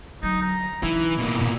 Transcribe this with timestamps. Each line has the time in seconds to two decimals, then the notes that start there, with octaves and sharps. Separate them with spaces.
0.23 D3 F#3 D#4
0.42 A#5
0.83 C#3 E3 D#4 E4
1.18 B2 A#3
1.39 A#2 D3